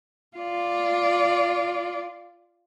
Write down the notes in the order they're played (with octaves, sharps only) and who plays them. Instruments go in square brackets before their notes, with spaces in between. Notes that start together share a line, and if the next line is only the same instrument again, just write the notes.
[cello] F4 D5